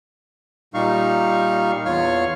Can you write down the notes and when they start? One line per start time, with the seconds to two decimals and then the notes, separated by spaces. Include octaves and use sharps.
0.74 A#2 G3 D#4 F5 C#6
1.85 E2 F4 C#5 F5 C#6 F6